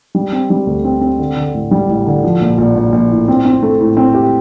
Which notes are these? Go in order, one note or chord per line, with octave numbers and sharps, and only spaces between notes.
G3
C4
G3
D2
C4
C4
D3
D3
A1
G3
A1
D3
F3
A#1
A#1
A#1
A#1
A2
C4
C4
A3
A2
C4
G4